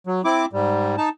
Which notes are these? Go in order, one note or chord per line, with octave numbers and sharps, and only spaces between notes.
F#3
C4 E4 D6
G#2 G3
D#4 A5